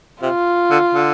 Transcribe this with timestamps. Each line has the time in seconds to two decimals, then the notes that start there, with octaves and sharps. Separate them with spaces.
0.22 C3 F4
0.70 D3
0.95 D3